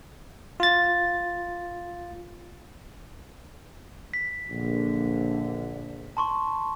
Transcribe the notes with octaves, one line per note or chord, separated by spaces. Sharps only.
F4 A6
B6
A#1 D3
A5 C6 C#6